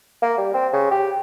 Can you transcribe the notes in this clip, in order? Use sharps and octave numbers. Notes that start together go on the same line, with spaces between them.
A#3
G3
C4
C#3
G4